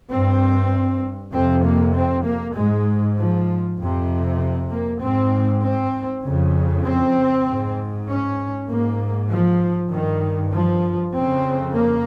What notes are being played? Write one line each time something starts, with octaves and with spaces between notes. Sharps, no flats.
G2 C4
F2 C3 C4
A#3
C4
A#3
G#2 G#3
F3
F2 C3
A#3
G#2 C4
C4
F2 C#3
C4
G#2
C#4
G#2 A#3
F3
G2 D#3
F3
F2 C#3 C4
A#3